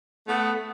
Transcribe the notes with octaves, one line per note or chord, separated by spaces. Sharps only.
A3 B3